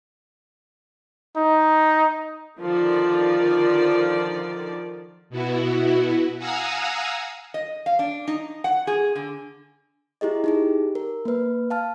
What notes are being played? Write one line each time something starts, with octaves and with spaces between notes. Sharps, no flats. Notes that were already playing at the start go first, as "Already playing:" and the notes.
D#4
D3 D#3 F3 D5
B2 B3 E4 F#4
F5 F#5 G#5 A#5 D#6 E6
D#5
F5
D4
D#4
F#5
G#4
D3
E4 G4 G#4 D#5
D#4 G4 G#4
A#4
A#3 B4
F5 A5 F6